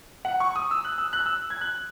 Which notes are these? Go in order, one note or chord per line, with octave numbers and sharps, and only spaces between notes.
F#5
C#6
D#6
E6
F#6
E6
F#6
E6
G#6
F#6